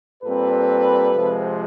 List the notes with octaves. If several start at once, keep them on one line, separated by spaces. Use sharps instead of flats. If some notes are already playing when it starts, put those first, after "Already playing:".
A#2 G3 C4 A4 B4
F2 C3 F3 G#3